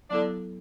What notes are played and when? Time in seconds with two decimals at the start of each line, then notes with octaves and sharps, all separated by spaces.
0.10 D3 F#3 B3 D4 E4 A4